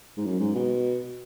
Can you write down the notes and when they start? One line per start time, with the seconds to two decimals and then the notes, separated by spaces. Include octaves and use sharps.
0.17 G#2
0.25 F#2
0.40 G#2
0.55 B2